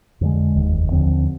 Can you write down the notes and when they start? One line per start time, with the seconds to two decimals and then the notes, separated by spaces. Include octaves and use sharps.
0.21 F2 D3 G#3
0.56 F1 D#2 D#3
0.92 D#2 D3 F3 C4